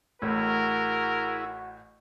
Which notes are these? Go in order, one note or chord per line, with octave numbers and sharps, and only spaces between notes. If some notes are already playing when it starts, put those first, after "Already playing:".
A1 A2 E4 F#4 G#4 A#4